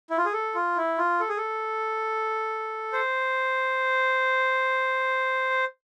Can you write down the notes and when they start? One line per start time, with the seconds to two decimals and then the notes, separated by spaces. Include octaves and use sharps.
0.10 E4
0.18 F4
0.25 G#4
0.33 A4
0.55 F4
0.77 E4
0.98 F4
1.20 A4
1.29 G#4
1.37 A4
2.92 C5